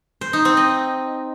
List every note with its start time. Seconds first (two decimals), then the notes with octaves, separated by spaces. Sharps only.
0.21 C5
0.33 D#4
0.45 C4
0.57 D#5